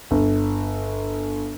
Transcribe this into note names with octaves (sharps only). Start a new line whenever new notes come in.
G1